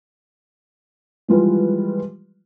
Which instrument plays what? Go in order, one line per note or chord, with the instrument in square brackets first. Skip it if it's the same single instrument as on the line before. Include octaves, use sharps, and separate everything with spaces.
[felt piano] E3 F3 G3 G#3 F4 B4